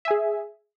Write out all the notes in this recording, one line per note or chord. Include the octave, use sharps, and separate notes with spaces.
G#4 E5 G#5